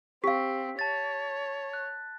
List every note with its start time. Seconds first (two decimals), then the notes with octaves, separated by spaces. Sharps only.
0.24 C4 G4 F5 B6
0.79 C#5 A5 A6
1.73 F#6